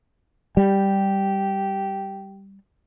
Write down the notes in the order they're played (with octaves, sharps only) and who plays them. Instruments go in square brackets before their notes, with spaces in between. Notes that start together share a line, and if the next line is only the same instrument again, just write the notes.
[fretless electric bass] G3 [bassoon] G4